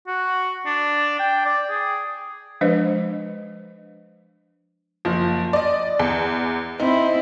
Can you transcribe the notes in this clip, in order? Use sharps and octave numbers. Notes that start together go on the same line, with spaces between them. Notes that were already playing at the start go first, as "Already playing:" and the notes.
F#4
D4
G5
D5
G#4
F3 G#3 D4 B4 C5 D#5
F#1 F3
D5 D#5
E2
C4 D#4 E4